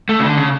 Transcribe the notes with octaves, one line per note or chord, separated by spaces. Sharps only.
A3
C#3
D3
C#3